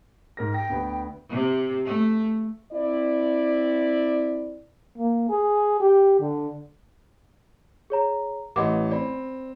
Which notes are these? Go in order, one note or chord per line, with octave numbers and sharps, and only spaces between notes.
G#2 A#4 A#6
G5 A#6
D2 B3
C3
A3
C4 E4 D5
A#3
G#4
G4
D3
G#4 C#5 A#5
A1 E3 D#5 F#5 D6
C4 D5 B5